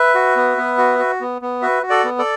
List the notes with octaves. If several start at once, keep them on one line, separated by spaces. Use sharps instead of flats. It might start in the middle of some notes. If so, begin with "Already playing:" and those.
Already playing: B4 E5
F#4
B3
B3
F#4
F#4
B3
B3
F#4 B4 E5
F#4
A4 D5
B3
A4 D5